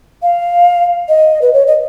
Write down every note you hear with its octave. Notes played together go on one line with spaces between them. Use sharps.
F5
D#5
B4
C#5
D#5